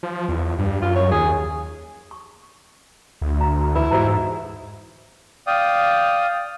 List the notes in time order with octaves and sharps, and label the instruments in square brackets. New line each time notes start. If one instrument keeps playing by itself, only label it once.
[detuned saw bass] F3
E2
G2
[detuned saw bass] F#2 [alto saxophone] F4
[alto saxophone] C#5
[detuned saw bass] D#2 [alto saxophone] G#4
[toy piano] C#6
[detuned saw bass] D2
[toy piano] A#5
[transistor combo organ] E2 E4 [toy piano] B4 B5
[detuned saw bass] G#2 [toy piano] F#4 C5 A#5
[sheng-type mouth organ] D5 F5 G5 D#6